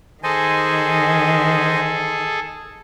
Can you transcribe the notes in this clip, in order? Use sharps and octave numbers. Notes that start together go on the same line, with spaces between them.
D#3 G#4 A4 C5 D#5 G#5